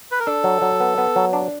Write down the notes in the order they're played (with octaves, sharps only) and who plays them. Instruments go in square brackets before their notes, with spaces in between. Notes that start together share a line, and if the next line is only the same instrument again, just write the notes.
[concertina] B4
A#4
[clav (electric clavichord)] D4 [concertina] A4
[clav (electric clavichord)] F#3
F#3
B3
B3
F#3
D4